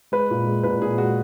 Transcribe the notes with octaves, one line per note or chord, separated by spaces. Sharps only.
G#3 B4
A#2
G#3
A#2 B4
A#2 G#4
G#3 F#4